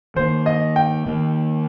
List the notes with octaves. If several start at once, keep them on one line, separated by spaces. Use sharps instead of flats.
D#3 A#3 C5
D#5
G5
D#3 A#3